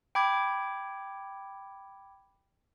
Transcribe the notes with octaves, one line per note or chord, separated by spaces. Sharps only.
G5 B5 D6 G#6